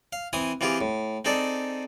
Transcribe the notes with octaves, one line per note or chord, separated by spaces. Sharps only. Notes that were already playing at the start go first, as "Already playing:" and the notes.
F5
E3 C4 G#5 D#6
E3 C4 F4 G4 G#4
A2
C4 D#4 G#4 A4 D5